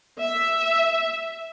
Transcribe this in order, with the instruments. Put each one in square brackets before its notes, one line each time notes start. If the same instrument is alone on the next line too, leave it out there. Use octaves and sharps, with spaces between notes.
[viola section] E5